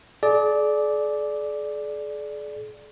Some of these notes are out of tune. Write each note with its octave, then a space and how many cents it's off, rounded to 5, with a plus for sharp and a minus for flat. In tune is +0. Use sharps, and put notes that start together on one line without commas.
G#4 +45 D5 +0